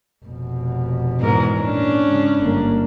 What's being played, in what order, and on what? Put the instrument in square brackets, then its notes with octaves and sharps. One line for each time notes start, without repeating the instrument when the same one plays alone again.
[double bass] F1 B2
[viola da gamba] E2 G#2 A#4
[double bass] A#2 [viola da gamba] C#4 D4
[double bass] G#2 C#3
G1 A#3